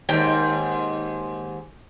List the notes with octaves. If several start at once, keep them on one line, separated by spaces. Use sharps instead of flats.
D#2 G#2 G5